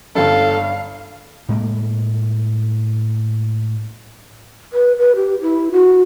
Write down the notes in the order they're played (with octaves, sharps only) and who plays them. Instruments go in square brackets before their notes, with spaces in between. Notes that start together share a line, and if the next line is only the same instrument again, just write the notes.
[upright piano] G1 G2 [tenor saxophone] A4 [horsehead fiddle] F5
[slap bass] A2 G#3 A#3
[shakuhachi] B4
B4
G4
E4
F#4